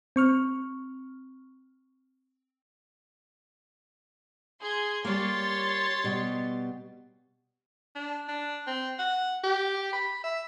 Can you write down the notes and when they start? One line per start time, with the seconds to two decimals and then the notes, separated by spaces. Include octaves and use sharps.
0.16 C4 C#6 F6
4.60 G#4 C6 G#6
5.05 G3 A#3 C#5 C6 A6
6.04 B2 G3
7.95 D4
8.28 D4
8.67 C4
8.99 F#5
9.44 G4
9.93 B5
10.24 E5